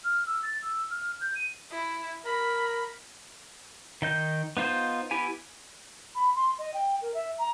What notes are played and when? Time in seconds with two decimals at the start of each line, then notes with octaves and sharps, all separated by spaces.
0.04 F6
0.26 E6
0.43 A6
0.62 E6
0.90 F6
1.21 G6
1.35 D#7
1.71 E4
2.26 A#4 B5
4.02 D#3 D#5 G6
4.57 B3 D#4 F4 C5 G6
5.11 B3 E4 G4 G#5
6.15 B5
6.35 C6
6.58 D#5
6.73 G5
7.01 A#4
7.14 E5
7.38 A#5